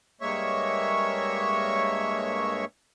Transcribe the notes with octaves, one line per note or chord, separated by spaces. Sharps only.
G2 G#3 A#3 C#5 E5 C#6